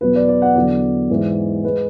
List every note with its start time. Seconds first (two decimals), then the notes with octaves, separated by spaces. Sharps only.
0.01 E2 B2 F#3 B4
0.16 D5
0.28 D5
0.42 F#5
0.55 E2 D3 F#3 D5
1.09 G#2 E3 G#3
1.64 G#3 B4